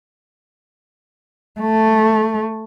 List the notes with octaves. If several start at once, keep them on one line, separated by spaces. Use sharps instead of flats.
A3